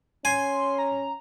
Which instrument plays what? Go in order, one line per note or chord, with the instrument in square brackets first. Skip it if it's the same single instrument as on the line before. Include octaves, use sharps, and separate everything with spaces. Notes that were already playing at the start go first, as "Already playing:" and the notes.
[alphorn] C#4 [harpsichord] G#5 [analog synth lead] C6
[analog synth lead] A#5